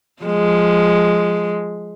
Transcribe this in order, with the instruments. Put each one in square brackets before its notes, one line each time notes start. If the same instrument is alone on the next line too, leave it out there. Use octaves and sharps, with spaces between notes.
[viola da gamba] F3 G#3